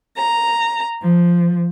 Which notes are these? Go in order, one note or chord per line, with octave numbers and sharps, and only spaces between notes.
A#5
F3